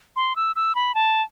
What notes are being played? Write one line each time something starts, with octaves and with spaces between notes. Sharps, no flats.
C6
E6
E6
B5
A5